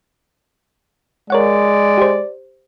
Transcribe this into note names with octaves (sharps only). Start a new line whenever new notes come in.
G#3 A#4 C#5 D5 F#5
G4 C5